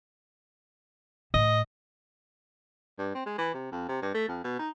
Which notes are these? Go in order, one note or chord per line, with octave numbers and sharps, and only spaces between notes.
A2 D#5
G2
C4
G#3
E3
C3
F2
C3
G2
A3
F2
B2
D#4